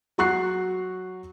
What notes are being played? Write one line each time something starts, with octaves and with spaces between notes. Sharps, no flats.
F#3 F#4 C#6 F#6 C7